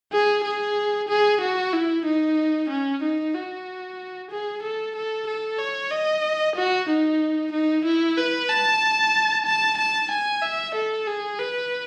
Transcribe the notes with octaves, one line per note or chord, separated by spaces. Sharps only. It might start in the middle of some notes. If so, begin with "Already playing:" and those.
G#4
G#4
G#4
F#4
E4
D#4
C#4
D#4
F#4
G#4
A4
A4
A4
C#5
D#5
F#4
D#4
D#4
E4
B4
A5
A5
A5
G#5
E5
A4
G#4
B4